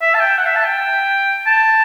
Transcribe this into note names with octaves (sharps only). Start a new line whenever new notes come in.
E5
A5
G5
F#5
E5
A5
G5
A5